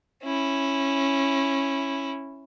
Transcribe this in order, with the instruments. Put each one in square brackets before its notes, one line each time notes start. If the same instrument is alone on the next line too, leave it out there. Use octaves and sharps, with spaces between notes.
[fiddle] C#4 E4